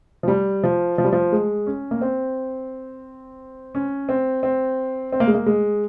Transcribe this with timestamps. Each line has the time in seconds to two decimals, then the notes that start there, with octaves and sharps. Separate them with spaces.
0.23 F3
0.28 G3
0.63 F3
0.98 F3
1.04 G3
1.13 F3
1.32 G#3
1.67 C#4
1.91 A#3
2.01 C4
3.75 C#4
4.09 C4
4.43 C4
5.12 C4
5.20 A#3
5.27 G#3
5.34 A#3
5.46 G#3